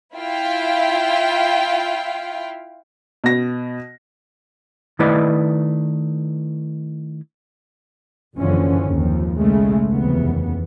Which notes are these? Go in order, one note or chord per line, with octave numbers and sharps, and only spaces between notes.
E4 F4 F5 G5
B2 A#6
D#3 A3 E4 B4 D5 D#5
F#1 F#2 D3 E3 F3 C#4
G#1 D#2 D#3 F3
B1 C#3 G#3 A3
F1 D#2 C#3 E3 B3